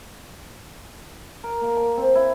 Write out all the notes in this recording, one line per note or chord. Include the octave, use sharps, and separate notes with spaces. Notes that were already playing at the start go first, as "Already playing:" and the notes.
A#4
A#3
A5
C4
E4